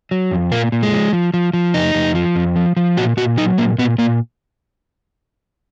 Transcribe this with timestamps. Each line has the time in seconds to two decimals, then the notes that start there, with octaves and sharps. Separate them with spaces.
0.11 F#3
0.31 F2
0.52 A#2 A#3
0.72 A#2
0.83 G#3
0.93 F3
1.13 F3
1.34 F3
1.53 F3
1.74 F2 D#4
1.95 F2
2.15 F3
2.36 F2
2.56 F3
2.77 F3
2.97 A#2 F#4
3.17 A#2 F#4
3.37 F#3 D#4
3.58 A#2 A#3
3.78 A#2 B3
3.98 A#2 A#3